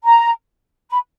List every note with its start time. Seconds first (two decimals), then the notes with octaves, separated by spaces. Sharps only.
0.04 A#5
0.90 B5